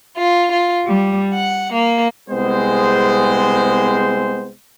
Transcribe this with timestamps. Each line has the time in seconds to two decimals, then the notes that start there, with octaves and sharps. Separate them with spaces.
0.16 F4
0.51 F4
0.85 G3
1.32 F#5
1.73 A#3
2.30 C2 G#3 B3 C4 G#4 C5